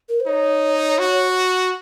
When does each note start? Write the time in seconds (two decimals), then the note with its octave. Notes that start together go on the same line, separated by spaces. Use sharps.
0.09 A#4
0.20 C5
0.27 D#4 C#5
0.99 F#4